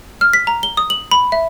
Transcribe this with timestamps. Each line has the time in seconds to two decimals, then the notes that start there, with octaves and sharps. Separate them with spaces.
0.21 F6
0.33 B6
0.47 A#5
0.63 G7
0.77 D#6
0.90 F#7
1.11 B5
1.32 E5